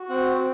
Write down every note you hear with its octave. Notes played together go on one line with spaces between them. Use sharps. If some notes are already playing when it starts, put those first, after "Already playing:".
Already playing: F#4
C4 F#5
C4